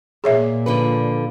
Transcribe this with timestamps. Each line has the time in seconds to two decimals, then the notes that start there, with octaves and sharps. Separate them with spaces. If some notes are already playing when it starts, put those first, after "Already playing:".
0.24 A#2 G#4 C#5 E5
0.66 D3 F3 B4